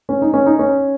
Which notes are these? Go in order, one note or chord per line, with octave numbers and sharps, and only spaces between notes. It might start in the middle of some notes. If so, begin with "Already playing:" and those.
C#4
D#4
C#4
D#4
C#4